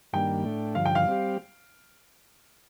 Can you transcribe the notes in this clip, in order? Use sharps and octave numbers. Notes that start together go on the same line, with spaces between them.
G2 D#3 G3 A#3 D4 G5
A2 A3 D4
G2 D3 F3 F5
G5
F5
G3 C4 G4